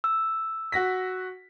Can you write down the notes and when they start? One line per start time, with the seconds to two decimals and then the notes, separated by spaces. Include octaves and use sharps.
0.04 E6
0.72 F#4 A#6 B6